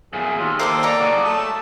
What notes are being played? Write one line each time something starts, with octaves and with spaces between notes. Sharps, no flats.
E2 A#2 G#4
D#2 F4
A#3 D#4 A4 C5 D5 C6
C#5 D5 A#5
F#4 G#4
A3 A4 A5